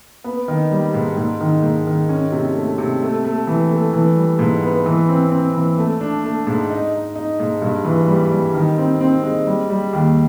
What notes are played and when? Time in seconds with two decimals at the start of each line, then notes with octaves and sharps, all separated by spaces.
0.24 B3
0.48 D#3
0.71 G3
0.94 G#2
1.17 G#2
1.40 D#3
1.63 G#2
1.87 D#3
2.09 C#4
2.32 C3
2.55 A3
2.78 C3
3.02 A3
3.25 A3
3.47 E3
3.71 A3
3.93 E3
4.16 G3
4.39 G#2
4.63 B3
4.86 E3
5.09 C4
5.31 C4
5.54 E3
5.78 A3
6.01 D4
6.24 A3
6.47 G#2
6.70 D#4
6.93 D#4
7.16 D#4
7.40 G#2
7.62 G2
7.85 E3
8.08 G3
8.31 G3
8.54 D#3
8.78 C4
9.01 C4
9.23 G#3
9.47 G3
9.70 G3
9.93 D#2